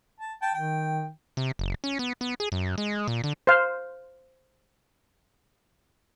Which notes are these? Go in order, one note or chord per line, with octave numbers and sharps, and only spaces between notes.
A5
G5 A5
D#3 G5
C3
F#1
C#4
B3
B3
G#4
F#2
G#3
A#2
D3
C5 F5